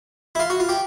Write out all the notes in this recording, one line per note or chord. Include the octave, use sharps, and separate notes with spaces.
E4
F4
F#4
F4
G4